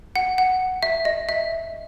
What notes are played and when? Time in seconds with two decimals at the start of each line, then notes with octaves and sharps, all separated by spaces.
0.16 F#5
0.38 F#5
0.83 E5
1.05 D#5
1.29 E5